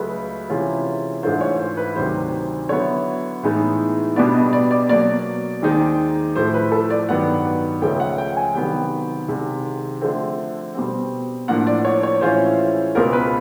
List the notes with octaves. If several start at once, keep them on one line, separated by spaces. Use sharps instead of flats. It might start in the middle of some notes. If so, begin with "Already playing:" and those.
Already playing: C#2 C#3 F#3 A3 B4
C3 E3 G#3 C#4 F4
G#2 E3 A3 D4 F4 C5
C#5
C5
B4
D2 C3 D#3 F#3 C5
D3 F#3 B3 E4 C#5
A2 E3 G#3 B3 D#4
B2 G3 B3 D4 D5
D#5
D5
D5
B2 F#3 A#3 D5
D#2 D#3 G#3 C4 D#4
A2 F3 A3 C5
B4
A4
D5
G2 D#3 F#3 B3 F#5
C#2 C#3 F3 A3 C#4 G5
F#5
G5
G#5
C2 C3 D#3 F#3 B3 G5
C2 C3 D#3 G#3
D3 F3 A3 C4
B2 G3 C4
A2 F3 A#3 D4 F#5
D5
C#5
C#5
A2 E3 G#3 C#4 F4 C5
C#2 B2 G#3 C4 F4 A#4
B4